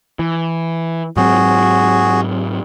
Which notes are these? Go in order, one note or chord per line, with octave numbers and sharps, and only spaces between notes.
E3
G#2 F#3 C4 F#4 G#4